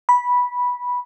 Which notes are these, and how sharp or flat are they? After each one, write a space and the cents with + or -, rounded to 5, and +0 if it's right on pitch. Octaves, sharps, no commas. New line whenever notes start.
B5 -10